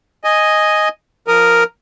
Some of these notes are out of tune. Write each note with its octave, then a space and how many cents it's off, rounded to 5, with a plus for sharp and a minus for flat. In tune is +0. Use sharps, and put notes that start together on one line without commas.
D#5 +0 G#5 +0
F3 +0 A#4 +0 D#6 -15